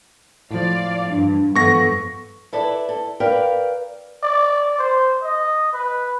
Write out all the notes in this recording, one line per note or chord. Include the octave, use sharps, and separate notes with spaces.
A2 F3 D5 F5
G2 D4
G2 F3 B3 A4 C#6 A#6
E4 A4 B4 D5
A4
A#4 B4 D5 F5 G5
D5
C5
D#5
B4